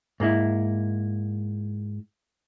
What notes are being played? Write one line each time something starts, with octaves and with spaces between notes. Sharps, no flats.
G#2 A#3 E4